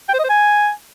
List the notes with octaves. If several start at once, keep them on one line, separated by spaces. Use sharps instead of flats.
G5
C5
D#5
C5
G#5